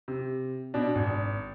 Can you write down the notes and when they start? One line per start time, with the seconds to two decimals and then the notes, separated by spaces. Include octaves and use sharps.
0.08 C3
0.74 B2 D4
0.95 G#1